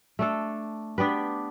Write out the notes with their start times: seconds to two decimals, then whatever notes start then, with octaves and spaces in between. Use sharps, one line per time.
0.19 A3 D4 A4
0.98 B3 D4 G4 B4